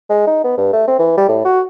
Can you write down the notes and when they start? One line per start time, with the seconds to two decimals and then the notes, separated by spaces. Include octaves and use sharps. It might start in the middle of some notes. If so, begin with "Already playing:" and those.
0.10 G#3
0.27 D#4
0.44 B3
0.58 G2
0.73 A3
0.88 C4
0.99 E3
1.17 G3
1.29 A2
1.45 F#4